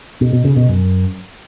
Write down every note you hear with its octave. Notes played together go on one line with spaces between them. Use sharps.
B2
B2
C#3
B2
F#2